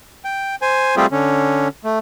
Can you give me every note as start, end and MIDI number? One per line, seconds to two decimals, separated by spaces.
0.25 0.55 79
0.62 0.95 72
0.62 0.95 80
0.97 1.06 55
0.97 1.06 57
0.97 1.06 60
0.97 1.06 65
0.97 1.06 67
0.97 1.06 68
1.12 1.68 50
1.12 1.68 61
1.84 1.99 57